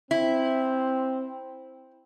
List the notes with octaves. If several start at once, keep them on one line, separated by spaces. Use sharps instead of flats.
C4 E4